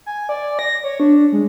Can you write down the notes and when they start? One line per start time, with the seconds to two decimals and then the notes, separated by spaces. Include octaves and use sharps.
0.06 G#5
0.29 D5
0.59 A#6
0.84 C#5
1.00 D4
1.32 G#3